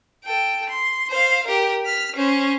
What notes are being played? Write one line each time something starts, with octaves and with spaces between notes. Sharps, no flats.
A4 G5
C6
C5 F5
G4 A#4
F6 B6
C#4 C5